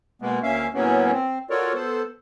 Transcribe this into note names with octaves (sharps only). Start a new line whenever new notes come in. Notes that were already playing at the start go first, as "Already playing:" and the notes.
B2 G#3 A#3 B3
D2 A#3 C#4 E5 F5
A2 C#3 F#3 A#3 B3 C#4
C4
F4 F#4 A4 A#4 C#5 D5
B3 A4 C5